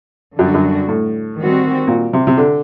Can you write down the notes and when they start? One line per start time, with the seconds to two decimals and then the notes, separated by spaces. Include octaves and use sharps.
0.39 F#2 D3 G3 D4 F#4
0.54 F#2
0.89 A2
1.39 D#3 G3 C4 F#4
1.87 A#2
2.13 C3
2.27 C3
2.37 D3